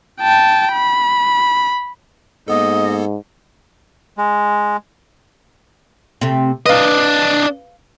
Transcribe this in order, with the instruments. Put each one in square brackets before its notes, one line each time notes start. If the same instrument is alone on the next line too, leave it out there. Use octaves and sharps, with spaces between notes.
[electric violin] G5 A5
B5
[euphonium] G#2 [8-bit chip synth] A#3 B3 A4 [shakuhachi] D#5
[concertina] G#3
[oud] C3 A3
[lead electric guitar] D4 D#5 [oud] B4 F5